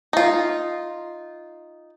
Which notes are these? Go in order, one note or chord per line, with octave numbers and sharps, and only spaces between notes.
D#4 F4